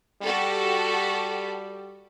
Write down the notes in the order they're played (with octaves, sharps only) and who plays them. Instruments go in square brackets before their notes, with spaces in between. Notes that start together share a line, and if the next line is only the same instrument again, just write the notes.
[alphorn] G3 [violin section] F#4 G4 A4